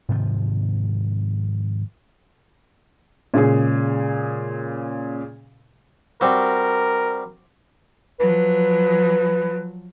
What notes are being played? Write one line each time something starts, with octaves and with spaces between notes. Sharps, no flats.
G#2 C3 D#3 F3
A#2 C#3 G#3 G#4
G3 C4 F#4 A#4
F3 F#3 B4